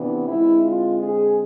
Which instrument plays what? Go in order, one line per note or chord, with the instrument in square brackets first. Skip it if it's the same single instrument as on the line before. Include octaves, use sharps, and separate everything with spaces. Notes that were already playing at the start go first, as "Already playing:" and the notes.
Already playing: [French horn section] C3 E3 B3 D4
D3 G#3 C4 E4
F4
G#4